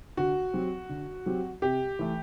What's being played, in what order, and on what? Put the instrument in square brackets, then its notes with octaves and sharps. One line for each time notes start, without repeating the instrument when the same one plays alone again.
[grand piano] D3 [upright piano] F#4
[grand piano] F#3 C4 G4
D3
F#3 C4 G4
[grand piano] C3 [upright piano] G4
[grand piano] E3 A3